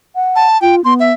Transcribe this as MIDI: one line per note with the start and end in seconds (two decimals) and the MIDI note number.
0.15 0.47 78
0.36 0.60 81
0.62 0.83 65
0.62 0.76 79
0.85 1.11 59
0.85 0.94 84
1.00 1.13 76